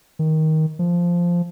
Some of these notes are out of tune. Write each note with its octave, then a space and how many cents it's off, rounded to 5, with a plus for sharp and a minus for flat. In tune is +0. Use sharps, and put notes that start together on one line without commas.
D#3 +15
F3 -5